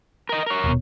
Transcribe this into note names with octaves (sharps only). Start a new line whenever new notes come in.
A#4 D#5
A#4 C#5
D#1 B2